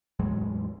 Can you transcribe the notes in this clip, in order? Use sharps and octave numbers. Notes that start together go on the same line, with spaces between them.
E2 A2 F#3 G#3